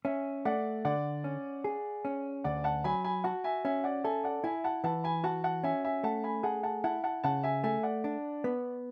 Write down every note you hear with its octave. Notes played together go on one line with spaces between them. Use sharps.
C#4 E5 G#5
A3 D5 F#5
D3 D5 F#5
C#4
G#4
C#4
D2 D5 F#5
F#5 A5
F#3 G#5 B5
G#5 B5
F#4 F#5 A5
E5 G#5
C#4 E5 G#5
D5 F#5
A4 E5 G#5
D5 F#5
E4 E5 G#5
F#5 A5
E3 F#5 A5
G#5 B5
F#4 F#5 A5
F#5 A5
C#4 E5 G#5
E5 G#5
A3 F#5 A5
G#5 B5
G#4 F#5 A5
F#5 A5
E4 F#5 A5
F#5 A5
C#3 F#5 A5
E5 G#5
A3 E5 G#5
D5 F#5
D4
B3